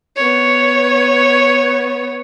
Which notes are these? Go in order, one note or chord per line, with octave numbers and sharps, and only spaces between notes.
B3 C#5